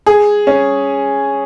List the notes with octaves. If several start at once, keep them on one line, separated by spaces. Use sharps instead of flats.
G#4
C#4